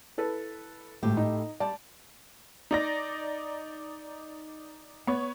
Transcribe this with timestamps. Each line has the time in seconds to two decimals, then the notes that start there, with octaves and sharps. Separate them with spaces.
0.18 E4 A4 B4
1.03 G#1 A2 G4
1.17 D#4
1.60 G3 D5 A5
2.71 D#4 D5 A#6
5.07 B3 C#5